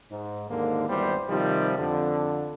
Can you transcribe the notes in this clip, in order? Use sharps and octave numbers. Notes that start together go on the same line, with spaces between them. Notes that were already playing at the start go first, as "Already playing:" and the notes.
G#2
D#2 G#2 D3 A#3
G#1 E2 G3 C5
C3 D#3 F3 G3
F2 D3